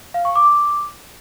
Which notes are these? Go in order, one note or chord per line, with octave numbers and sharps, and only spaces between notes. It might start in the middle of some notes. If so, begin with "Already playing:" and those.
F5
C#6
D6